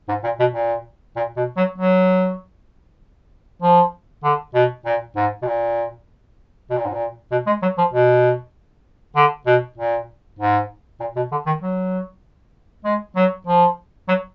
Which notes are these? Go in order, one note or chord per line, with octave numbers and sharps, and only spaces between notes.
G#2
A#2
B2
A#2
A#2
B2
F#3
F#3
F3
D3
B2
A#2
G#2
B2
A#2
B2
A#2
G#2
A#2
B2
G#3
F#3
F3
B2
D3
B2
A#2
G#2
A#2
B2
D3
D#3
F#3
G#3
F#3
F3
F#3